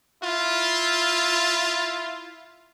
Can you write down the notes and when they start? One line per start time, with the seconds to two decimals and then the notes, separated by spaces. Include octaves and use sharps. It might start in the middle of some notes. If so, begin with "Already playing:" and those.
0.22 E4 F4